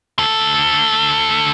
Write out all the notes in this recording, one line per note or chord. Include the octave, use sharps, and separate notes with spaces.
D2 A4